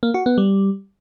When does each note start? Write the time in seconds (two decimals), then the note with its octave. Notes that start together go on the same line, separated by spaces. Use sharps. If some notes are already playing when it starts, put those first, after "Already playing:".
0.03 A#3
0.14 F#4
0.26 B3
0.38 G3